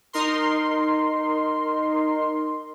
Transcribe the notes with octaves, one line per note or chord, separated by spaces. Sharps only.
D#4 A#4 C6